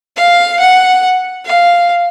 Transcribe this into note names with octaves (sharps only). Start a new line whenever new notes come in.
F5
F#5
F5